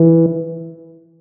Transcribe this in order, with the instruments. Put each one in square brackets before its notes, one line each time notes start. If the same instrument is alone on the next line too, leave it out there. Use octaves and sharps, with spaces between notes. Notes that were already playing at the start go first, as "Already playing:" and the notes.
Already playing: [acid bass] E3